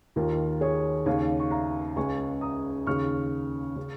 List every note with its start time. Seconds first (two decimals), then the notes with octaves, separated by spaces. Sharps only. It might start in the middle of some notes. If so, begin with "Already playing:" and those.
0.16 D#2 D#3 F4 A#4
0.61 G#4 C#5
1.06 D#2 C#3 C#5 F5
1.40 C#6
1.51 F5 A#5
1.96 C#2 C#3 G#5 C#6
2.41 A#5 D#6
2.87 D#2 C#3 C#6 F6
3.76 C#3